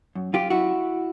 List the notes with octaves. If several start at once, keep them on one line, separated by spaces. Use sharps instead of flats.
F#2
F#2 F4 G4
F#2 E4 F#4